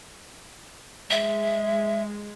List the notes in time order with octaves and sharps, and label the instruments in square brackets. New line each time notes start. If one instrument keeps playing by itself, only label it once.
[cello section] G#3 [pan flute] E5